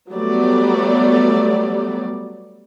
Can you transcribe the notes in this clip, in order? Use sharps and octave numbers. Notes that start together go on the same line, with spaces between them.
F#3 G3 A3 B3 D5